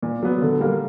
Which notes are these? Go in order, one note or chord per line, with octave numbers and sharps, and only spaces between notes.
A#2
F#3 B3
D3
G3 A#3